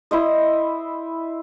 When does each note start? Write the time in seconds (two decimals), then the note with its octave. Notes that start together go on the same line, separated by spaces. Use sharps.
0.11 E4 C5 D#5